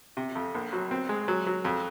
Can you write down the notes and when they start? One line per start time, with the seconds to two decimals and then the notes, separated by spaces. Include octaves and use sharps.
0.17 C3
0.35 F2
0.54 A#1
0.73 F#3
0.91 C4
1.09 G#3
1.28 F#3
1.47 F#3
1.65 F2